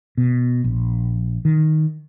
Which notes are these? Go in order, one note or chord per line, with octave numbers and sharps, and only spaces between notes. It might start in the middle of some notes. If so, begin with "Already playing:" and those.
B2
A#1
D#3